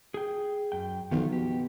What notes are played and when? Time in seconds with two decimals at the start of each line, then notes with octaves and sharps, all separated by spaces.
0.14 G#4 G5
0.72 F#2 G5
1.11 B1 D#3 F3
1.33 B2 G4